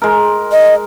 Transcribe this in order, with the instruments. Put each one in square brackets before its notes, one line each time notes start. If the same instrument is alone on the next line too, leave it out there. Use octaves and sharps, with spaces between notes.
[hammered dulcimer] G#3 A#4
[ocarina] D#5